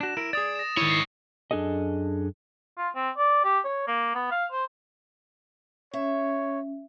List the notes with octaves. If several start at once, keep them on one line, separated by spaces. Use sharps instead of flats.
D4 F#4 E7
E4 A#4 D7
G#4 D5 D#6 A6
A#6 E7
G#2 D#3 E4 C#5 D#7
C7
F#2 D4 G#4 A4 D#5
F4
C4
D5
G4
C#5
A#3
B3
F5
C5
C#4 C#5 E5